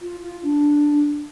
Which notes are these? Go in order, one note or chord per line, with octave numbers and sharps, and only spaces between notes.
F4
F4
D4